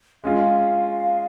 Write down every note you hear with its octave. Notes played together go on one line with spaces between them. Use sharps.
G#3 C#4 F4 F5